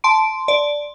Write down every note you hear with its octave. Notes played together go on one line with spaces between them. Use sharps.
A5 C6 D7
D5